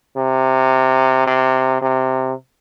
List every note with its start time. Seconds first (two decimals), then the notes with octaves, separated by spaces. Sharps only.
0.17 C3
1.27 C3
1.82 C3